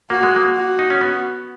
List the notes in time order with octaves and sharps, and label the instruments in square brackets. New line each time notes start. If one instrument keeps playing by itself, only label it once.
[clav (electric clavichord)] A#3 [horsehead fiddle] F#4
[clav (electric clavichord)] G#3
A#3
[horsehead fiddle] F#4
[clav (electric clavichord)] D#4
C#4
B3